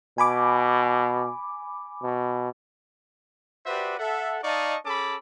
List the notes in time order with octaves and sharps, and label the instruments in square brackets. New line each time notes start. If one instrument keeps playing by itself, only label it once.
[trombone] B2 [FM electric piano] G#5 B5 D6
[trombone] B2
[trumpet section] F#4 G4 B4 C5 D5 E5
A4 E5 F#5
D#4 D5 D#5 F5 A5 C#6
C#4 G#4 A4 A5 B5 D6